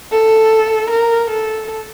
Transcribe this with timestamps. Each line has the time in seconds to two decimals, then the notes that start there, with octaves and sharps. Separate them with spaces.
0.12 A4
0.90 A#4
1.30 A4